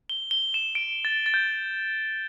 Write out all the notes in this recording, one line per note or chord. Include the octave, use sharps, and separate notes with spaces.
G7
G7
E7
D7
A6
A6
G6